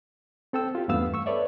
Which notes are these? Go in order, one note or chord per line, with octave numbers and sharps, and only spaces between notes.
C4 A4 G5 E6
F4 G4
E2 G2 A3 B3 F5 E6
C#6 E6
A4 B4 C#5 D5 E5